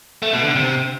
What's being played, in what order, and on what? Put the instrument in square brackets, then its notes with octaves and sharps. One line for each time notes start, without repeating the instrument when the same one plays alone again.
[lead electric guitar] A3
B2
D3
C3